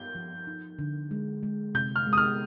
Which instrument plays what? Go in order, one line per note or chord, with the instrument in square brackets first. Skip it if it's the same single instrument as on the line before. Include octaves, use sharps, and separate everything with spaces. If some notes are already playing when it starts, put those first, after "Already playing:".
Already playing: [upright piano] G6
[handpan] F3
D#4
D3
G#3
G#3
[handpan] C3 [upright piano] G6
[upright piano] F6
[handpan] G#3
[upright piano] D#6
F6